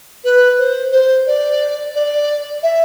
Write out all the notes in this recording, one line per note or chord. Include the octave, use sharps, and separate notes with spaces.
B4
C5
C5
D5
D5
E5